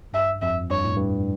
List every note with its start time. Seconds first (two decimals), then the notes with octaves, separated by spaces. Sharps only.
0.13 G2 E5
0.42 F2 E5
0.70 G2 C#5
0.84 A2
0.96 G2